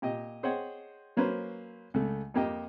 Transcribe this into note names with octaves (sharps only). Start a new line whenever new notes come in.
A#2 G4 D#5
G#4 C5 C#5 D#5 F#5 G5
F#3 A#3 C#4 B4 C5
C#2 A3
F2 A#3 G4 D#5